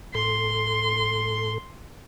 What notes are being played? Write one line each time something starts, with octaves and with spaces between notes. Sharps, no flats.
A2 A4 C6